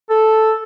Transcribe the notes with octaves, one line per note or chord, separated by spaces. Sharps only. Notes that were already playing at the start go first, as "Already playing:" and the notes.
A4